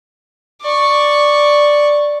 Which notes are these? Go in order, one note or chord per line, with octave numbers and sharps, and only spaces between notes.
D5 C#6